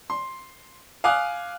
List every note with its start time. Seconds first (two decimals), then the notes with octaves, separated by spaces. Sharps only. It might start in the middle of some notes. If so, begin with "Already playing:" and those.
0.10 C6
1.04 F5 G#5 D6 D#6 F6 F#6